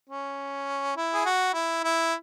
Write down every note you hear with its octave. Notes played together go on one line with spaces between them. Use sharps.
C#4
E4
G#4
F#4
E4
E4